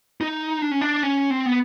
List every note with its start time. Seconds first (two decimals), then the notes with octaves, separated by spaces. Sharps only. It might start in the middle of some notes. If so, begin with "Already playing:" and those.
0.21 D#4
0.62 D4
0.72 C#4
0.81 D4
1.03 C#4
1.30 C4
1.46 B3